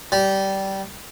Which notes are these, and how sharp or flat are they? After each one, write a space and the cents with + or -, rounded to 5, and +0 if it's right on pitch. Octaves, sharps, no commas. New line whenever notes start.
G3 -15